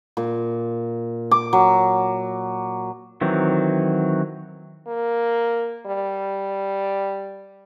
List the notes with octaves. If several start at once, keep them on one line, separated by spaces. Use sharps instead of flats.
A#2
D6
F#3
D#3 E3 F#3 C4
A#3
G3